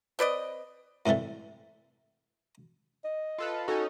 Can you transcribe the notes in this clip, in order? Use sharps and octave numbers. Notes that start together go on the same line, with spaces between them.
C4 B4 D5 D#5
A2 C3 E3 G3 A3
D#5
F4 A4 B4
C#4 D#4 F#4 A4